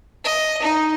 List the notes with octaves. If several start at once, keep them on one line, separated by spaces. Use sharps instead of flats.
D#5
D#4